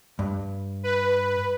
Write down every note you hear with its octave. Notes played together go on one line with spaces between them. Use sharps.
G2
B4